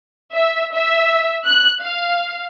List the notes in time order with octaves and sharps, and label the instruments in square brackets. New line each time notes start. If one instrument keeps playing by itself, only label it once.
[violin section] E5
E5
F#6
F5